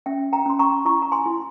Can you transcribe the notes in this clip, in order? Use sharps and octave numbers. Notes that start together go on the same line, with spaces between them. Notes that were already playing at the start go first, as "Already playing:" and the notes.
C#4 E5 G5
G5 A#5
C#4 C6
A#5 C#6
E4 A#5 C#6
A#5
G#5 C6
E4